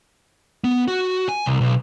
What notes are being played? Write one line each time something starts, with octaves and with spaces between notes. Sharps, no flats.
B3
F#4
G#5
C2
B1